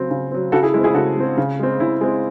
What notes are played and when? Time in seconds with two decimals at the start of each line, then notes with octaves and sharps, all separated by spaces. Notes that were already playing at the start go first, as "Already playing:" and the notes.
Already playing: C#3 F#3 C4
0.10 C#3
0.31 F#3 C4
0.52 C#3 F#4 A4
0.63 E4 G#4
0.74 G#3 E4
0.78 C4
0.84 E4 G#4
0.94 C#3 F#4 A4
1.16 G#3 C4
1.37 C#3
1.59 G#3 C4
1.80 C#3 E4
2.01 G#3 C4